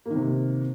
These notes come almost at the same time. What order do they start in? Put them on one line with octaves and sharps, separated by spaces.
A#3 D#3 C3